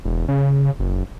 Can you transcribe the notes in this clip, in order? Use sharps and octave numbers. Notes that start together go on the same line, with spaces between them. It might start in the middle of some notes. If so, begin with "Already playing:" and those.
E1
C#3
F#1